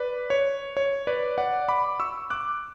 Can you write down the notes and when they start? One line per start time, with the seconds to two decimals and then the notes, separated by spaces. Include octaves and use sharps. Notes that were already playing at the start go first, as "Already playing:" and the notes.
Already playing: B4 D5
0.30 C#5
0.77 C#5
1.07 B4 D5
1.38 D5 F#5
1.69 B5 D6
2.00 C#6 E6
2.30 D6 F#6